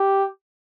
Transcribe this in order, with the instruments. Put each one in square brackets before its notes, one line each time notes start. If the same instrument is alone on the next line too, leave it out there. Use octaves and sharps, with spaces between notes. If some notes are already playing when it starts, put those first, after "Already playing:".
Already playing: [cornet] G4